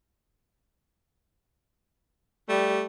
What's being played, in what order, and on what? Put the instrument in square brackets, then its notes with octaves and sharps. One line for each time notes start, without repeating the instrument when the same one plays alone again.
[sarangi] G3 [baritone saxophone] A3